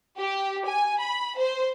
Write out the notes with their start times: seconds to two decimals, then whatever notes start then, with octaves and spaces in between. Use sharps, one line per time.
0.18 G4
0.66 G#5
0.99 B5
1.37 C5